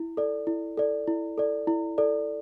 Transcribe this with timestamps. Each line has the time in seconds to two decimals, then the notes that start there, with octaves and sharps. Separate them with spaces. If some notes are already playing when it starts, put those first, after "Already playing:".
Already playing: E4
0.17 A4 D5
0.47 E4
0.77 A4 D5
1.07 E4
1.38 A4 D5
1.67 E4
1.98 A4 D5